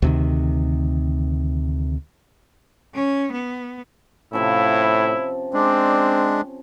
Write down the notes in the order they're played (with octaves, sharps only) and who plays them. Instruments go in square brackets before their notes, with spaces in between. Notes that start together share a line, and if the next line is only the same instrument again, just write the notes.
[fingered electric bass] D2 C3 D#3
[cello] C#4
B3
[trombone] A2 [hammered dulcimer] C3 F3 C#4 [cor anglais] E4
[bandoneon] G#3 D4 [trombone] C4 [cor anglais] D5